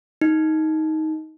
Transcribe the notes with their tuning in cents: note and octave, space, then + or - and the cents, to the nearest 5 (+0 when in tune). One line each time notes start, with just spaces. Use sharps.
D#4 +15